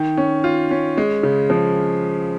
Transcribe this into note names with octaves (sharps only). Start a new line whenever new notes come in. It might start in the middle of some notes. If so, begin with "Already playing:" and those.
Already playing: D#3
C#4
F4
C#4
G#3
C#3
F3